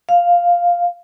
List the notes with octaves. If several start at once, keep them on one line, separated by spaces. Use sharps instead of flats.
F5